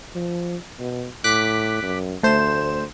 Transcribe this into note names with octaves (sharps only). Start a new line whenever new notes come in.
F3
B2
A2 D6 F#6 B6
F#2
D2 A3 C5 E7